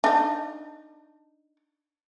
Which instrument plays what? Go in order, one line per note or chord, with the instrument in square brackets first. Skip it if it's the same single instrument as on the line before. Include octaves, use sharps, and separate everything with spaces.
[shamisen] D4 D#4